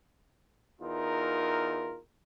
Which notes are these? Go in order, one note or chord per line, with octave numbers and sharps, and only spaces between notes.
E2 D#4 F4 A#4